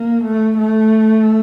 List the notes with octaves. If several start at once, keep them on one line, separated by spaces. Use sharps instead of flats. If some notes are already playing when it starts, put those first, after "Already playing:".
Already playing: A#3
A3
A3